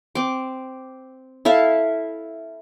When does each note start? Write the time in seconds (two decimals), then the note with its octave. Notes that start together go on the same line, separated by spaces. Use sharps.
0.15 C4 D6
1.45 E4 A4 E5 F5